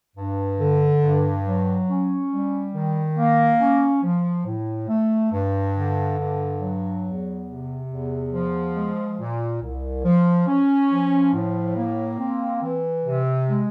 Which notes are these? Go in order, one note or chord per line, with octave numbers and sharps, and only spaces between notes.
G2
D3
G2
F#3
C#4
G3
D#3
A#3
C#4
F3
A2
A3
G2
D3
G2
F#3
E2
C3
E2
F3
G#3
A#2
C2
F3
C#4
F3
A2
A#3
C4
E3
C3
G#3